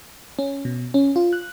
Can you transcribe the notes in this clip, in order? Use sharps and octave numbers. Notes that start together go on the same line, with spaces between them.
C#4
B2
C#4
F4
F#6